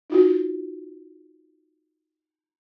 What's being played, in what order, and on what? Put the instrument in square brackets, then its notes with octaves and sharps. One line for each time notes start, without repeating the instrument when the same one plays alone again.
[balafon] D#4 F4 F#4